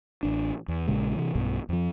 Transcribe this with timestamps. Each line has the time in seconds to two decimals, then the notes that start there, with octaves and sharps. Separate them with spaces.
0.23 A1 D4
0.68 E2
0.88 A#1 A#2 C#3 G#3
1.16 C3 E3
1.35 B1 G2 B2
1.69 F2 F3